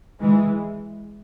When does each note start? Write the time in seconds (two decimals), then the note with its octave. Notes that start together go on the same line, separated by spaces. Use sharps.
0.20 E3 G#3